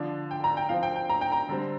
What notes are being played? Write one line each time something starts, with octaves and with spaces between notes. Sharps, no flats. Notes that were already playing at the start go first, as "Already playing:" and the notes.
Already playing: D3 F3 D4
G5
A#5
G5
F3 C4 F5
G5
G5
A#5
G5
A#5
D3 G3 C4